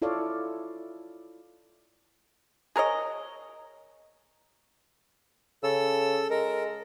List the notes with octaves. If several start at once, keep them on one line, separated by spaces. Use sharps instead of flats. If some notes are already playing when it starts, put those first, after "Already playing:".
E4 F4 A4 C#5 D5 F5
G#4 A#4 C#5 D#5
C#3 A4 E6
G#3 A#4